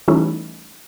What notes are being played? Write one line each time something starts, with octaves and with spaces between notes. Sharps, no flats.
E3 G3 A3 C#4 D#4 E4